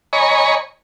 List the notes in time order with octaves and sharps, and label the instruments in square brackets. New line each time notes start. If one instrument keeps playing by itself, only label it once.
[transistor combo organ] C#5 D#5 G#5 A#5 B5 C#6